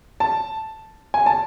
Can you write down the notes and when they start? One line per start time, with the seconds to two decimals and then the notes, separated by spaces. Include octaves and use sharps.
0.20 A5
1.14 G#5
1.26 A5